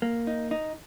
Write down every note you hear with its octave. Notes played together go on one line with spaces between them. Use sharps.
A#3
D#4
D#4